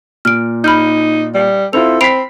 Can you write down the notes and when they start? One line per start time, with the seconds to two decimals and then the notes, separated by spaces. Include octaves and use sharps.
0.25 A#2 F6 D7
0.64 D#4 B5 F6 G6
1.34 G3
1.73 C4 E4 F4 A4 F7
2.01 C4 B5 B6 C7 D7 F7